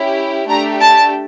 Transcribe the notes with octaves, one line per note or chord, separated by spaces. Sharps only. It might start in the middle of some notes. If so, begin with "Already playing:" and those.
Already playing: C#4 E4 G4
A3 D4 G4 A#5
A5